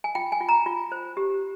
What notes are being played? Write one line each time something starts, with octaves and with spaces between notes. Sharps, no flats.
G#5
F4 G5
G#5
F4
A#5
F4
C5
G4